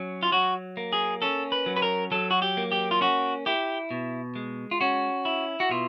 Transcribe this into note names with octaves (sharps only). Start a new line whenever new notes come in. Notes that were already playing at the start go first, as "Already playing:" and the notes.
Already playing: F#3 C#4
F4
F#3 F#4
A#3
G#4
C#4 A4
B4
F#3
B4
A#4
F#3 A4
F#4
G4
A#3
G4
F4
C#4 F#4
E4 G4
B2
G#3
F4
C#4 F#4
E4
F#4
B2 F4